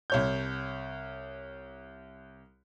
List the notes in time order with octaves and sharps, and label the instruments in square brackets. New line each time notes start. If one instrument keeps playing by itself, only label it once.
[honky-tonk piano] C2 C#5 G6